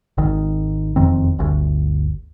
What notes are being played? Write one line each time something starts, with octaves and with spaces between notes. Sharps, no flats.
G#1 D#3
E1 F2 D#3 C4
G1 D2